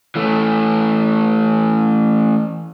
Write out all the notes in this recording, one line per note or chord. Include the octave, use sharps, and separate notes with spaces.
E3 A3